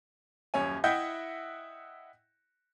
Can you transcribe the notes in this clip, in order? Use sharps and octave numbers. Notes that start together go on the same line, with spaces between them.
D#1 F#2 C#5 G#5
E4 D#5 E5 F#5 G5 G6